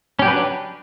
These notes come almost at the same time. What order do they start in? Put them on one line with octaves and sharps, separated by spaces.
C#4 G4 F#3 B4 D4